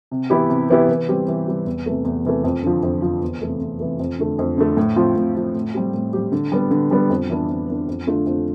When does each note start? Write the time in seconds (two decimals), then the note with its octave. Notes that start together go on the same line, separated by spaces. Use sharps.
0.11 C3
0.30 E3 B3 E4 G4
0.49 C3
0.70 E3 B3 E4 G4
0.89 E3
1.08 G3 C4 G4
1.28 E3
1.47 G3 C4 G4
1.66 E2
1.86 C3 E3 A3
2.05 E2
2.25 C3 E3 A3
2.44 F2
2.64 D3 F3
2.83 F2
3.02 D3 F3
3.22 E2
3.42 C3 E3 A3
3.60 E2
3.80 C3 E3 A3
3.99 F2
4.19 D3 A3
4.39 F2
4.58 D3 A3
4.77 A2
4.96 F3 C4 F4
5.16 A2
5.35 F3 C4 F4
5.54 A2
5.74 G3 C4 G4
5.94 A2
6.13 G3 C4 G4
6.32 D3
6.52 G3 B3
6.71 D3
6.91 G3 B3
7.10 F2
7.29 E3 B3 D4
7.49 F2
7.68 E3 B3 D4
7.88 F2
8.07 D3 A3 D4 F4
8.26 F2